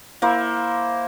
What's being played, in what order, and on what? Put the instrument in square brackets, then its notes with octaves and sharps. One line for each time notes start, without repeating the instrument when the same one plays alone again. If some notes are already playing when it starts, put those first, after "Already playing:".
[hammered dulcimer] A#3 E4 C5